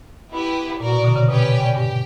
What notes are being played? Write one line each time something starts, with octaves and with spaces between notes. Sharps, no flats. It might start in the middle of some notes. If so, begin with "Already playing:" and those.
B3 E4 G4 B4
A#2 F#4 A#4 D5
B2
B2 D3
C#3
B2 C#4 G4 B4 D5 G5
G2 G4